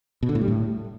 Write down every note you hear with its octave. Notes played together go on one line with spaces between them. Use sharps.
B2
D3
A2
G3
A2